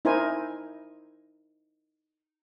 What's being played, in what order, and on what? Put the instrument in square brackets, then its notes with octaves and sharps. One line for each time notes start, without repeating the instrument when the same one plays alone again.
[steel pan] D#4 E4 A#4 C5 G#5